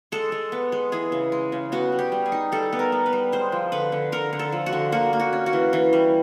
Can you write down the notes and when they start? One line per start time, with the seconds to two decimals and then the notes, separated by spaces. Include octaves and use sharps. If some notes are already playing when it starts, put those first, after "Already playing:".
0.12 G#3 A4
0.32 G#3
0.52 B3
0.72 G#3
0.92 E3 G#4
1.12 C#3
1.32 G#3
1.52 C#3
1.72 B3 F#4
1.92 G3
1.99 G4
2.12 G3
2.26 G#4
2.32 D#4
2.52 G3 A4
2.72 B3
2.79 A#4
2.92 B3
3.06 B4
3.13 G3
3.32 G#3 C5
3.52 F3
3.72 D3 B4
3.92 D3
4.12 D3 A#4
4.33 D3
4.39 A4
4.52 F3
4.66 F#4
4.73 D3
4.92 A#3 F#4
5.13 A#3
5.20 F#4
5.33 C#4
5.46 F#4
5.53 E3
5.73 E3
5.93 G3